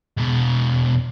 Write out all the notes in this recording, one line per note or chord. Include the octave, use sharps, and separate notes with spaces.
E2 B2